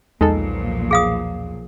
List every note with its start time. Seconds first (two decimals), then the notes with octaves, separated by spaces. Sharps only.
0.21 B1 E2 A#2 F3 G#3 D#4 A4
0.91 G#4 F5 D#6